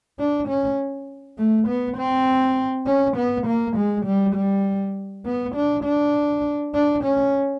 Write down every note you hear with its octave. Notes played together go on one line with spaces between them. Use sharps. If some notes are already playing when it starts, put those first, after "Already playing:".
D4
C#4
A3
B3
C4
C#4
B3
A#3
G#3
G3
G3
B3
D4
D4
D4
C#4